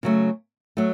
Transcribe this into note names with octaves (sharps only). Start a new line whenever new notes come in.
C#3 F#3 A3
F#3 A3